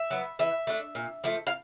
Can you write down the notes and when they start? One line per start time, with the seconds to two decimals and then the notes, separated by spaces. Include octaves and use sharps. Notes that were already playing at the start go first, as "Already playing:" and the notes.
Already playing: E5
0.11 F#3 B3
0.39 E3 E5
0.67 A3 D4
0.95 A#2
1.24 F3 A3
1.47 F5